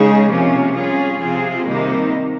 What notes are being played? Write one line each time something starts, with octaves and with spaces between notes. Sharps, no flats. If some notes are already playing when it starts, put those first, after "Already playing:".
Already playing: C#3 G#3 D#4 G#4
C3 F3 A#3 C#4 F4
G3 C#4 F4 G#4
C3 F3 C4 F4 G#4
C3 D#3 G3 A#3 D#4